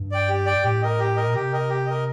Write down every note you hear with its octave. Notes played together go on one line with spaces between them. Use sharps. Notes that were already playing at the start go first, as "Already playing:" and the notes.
Already playing: G2
D5 G5
G4
D5 G5
A2 G4
A#4 D#5
G4
A#4 D#5
A#2
C3 G4
A#4 D#5
G4
A#4 D#5